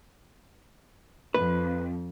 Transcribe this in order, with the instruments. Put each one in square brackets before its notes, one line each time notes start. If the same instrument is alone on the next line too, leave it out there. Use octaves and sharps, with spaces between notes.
[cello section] F2 [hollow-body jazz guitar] B4